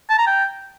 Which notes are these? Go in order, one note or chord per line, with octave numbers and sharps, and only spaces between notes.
A5
A#5
G5